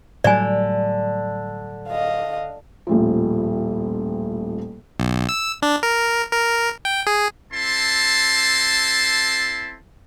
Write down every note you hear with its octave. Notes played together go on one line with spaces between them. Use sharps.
A2 D3 F#3 G3 D5 G#5
D#5 F5
D#1 A1 F3
B1
E6
D4
A#4
A#4
G5
G#4
C4 E4 A4 A5 C6